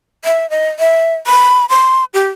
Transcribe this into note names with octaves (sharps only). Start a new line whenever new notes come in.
E5
D#5
E5
B5
C6
G4